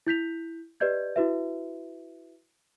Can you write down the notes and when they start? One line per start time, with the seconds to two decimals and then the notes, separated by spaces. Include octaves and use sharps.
0.07 E4 G6 B6 F7
0.80 G4 B4 D5 D#5 G6 G#6
1.16 E4 F#4 B4 E5